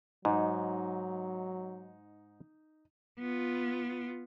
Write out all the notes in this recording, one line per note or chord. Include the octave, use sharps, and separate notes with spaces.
G#2 F#3 D#4
B3 F4